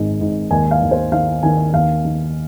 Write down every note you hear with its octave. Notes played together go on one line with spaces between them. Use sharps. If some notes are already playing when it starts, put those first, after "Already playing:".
Already playing: G#1 G#2
G#2
D#2 G#5
F5
D#2
C5
D#3 F5
D#3 G#5
D#2 F5
D#3